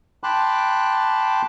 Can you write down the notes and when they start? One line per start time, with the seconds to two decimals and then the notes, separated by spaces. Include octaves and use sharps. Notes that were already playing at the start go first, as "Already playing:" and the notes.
0.23 G5 A5 B5 C6 D6 F#6